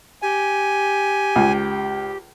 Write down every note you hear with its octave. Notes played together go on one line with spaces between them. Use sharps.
G4 G#5
C#2